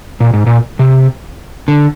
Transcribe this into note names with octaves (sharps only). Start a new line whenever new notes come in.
A#2
G#2
A#2
C3
D3